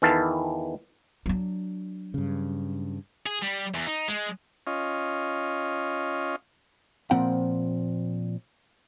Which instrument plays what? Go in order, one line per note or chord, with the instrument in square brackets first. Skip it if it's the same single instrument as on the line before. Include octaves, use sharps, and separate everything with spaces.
[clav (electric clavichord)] E2 D#3 E3 A4 F5 A5
[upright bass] F#3 D4
[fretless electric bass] G2 C#3
[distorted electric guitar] G#4
G3
E2
D#4
G#3
[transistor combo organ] C#4 F4 D#5
[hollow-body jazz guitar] A#2 F3 C4 F#5 G5 B5